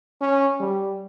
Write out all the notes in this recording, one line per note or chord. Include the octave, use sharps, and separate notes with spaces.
C#4
G3